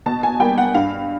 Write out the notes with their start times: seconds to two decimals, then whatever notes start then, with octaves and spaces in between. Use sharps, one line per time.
0.06 B2 A5
0.23 G#5
0.40 G3 A#3 G5
0.58 F#5
0.74 G2 F5